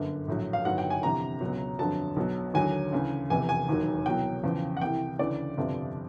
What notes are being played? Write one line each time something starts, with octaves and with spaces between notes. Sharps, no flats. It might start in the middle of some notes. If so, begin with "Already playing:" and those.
Already playing: G1 F#2 D3
A#1 A2 F#3
F5
G1 G2 D#3 F#3 F#5
G5
G#5
G1 F2 C3 E3 A#5
C#2 B2 F#3
G1 F2 D3 F#3 A5
B1 B2 F#3
D#2 D3 F#3 G#5
D2 C#3 E3
F1 E2 C3 E3 G#5
G#5
E1 D#2 D#3 F#3
C2 B2 F#3 G5
E2 C#3 F3
F#5
C2 C3 E3 G5
D2 C#3 E3 D5
G1 F2 C3 F3